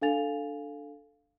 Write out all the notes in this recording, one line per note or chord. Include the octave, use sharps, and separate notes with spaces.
D4 A4 F5 G#5 A6 F7